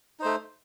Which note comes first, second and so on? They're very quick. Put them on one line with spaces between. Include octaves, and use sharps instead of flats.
D#4 C5 A3